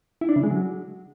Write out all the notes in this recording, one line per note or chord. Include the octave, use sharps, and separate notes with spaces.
E4
D4
C#3
G#3
F#3